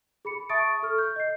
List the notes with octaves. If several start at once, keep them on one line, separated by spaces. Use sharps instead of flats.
G#4 B5 C#7
E5 A5 C#6 D#6 A6 D7
A4 C#6 F6
G6
D#5 C7